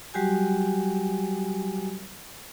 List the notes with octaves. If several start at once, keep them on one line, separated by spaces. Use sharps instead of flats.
F#3 G3 F#4 G4 G#5